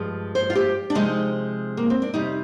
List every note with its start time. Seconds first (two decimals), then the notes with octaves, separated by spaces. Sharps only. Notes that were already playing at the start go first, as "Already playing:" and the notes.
Already playing: G2 F3 G#3
0.35 C5
0.50 F4
0.55 G4
0.90 D4
0.95 C3 F3 G#3 D#4
1.77 A#3
1.90 C4
2.02 D4
2.14 F2 C3 G3 D#4